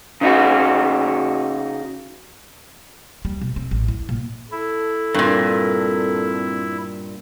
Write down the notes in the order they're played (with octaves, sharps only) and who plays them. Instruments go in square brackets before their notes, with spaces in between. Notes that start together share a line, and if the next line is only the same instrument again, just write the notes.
[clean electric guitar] C#3 D#4 F#4
[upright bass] G3
B2
C4
A1
E4
A#2
[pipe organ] E4 [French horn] A4
[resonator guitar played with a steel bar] G2 A#2 [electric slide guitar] C4 A#4